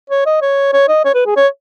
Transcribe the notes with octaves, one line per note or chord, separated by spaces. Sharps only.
C#5
D#5
C#5
C#5
D#5
C#5
B4
G#4
C#5